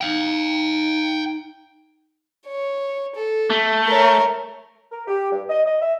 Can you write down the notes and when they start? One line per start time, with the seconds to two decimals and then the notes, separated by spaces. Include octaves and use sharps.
0.01 D#4 F5 G5
2.47 C#5
3.15 A4
3.50 A3
3.87 A#4 C#5
4.92 A#4
5.08 G4
5.31 G2
5.49 D#5
5.65 D#5
5.81 E5